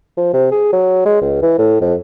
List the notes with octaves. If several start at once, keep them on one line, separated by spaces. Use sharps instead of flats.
F3
C3
G#4
F#3
G#3
C#2
E3
A2
F2